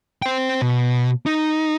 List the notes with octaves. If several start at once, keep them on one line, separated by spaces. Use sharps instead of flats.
C5 G5
B2
D#4